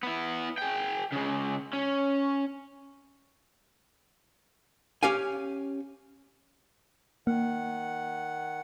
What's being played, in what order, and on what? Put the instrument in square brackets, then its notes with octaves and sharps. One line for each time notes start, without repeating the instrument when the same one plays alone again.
[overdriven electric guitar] B3 E4
G#4 G5
C#3 G#3
C#4
[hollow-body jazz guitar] C#4 G4 F5 G#5
[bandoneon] D#3 F#5 [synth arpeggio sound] A#3